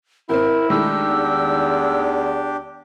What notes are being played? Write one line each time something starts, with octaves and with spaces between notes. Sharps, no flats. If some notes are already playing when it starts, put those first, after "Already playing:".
G#1 C4 E4 A#4
D#3 G#3 A3 D4 G4 E6
E2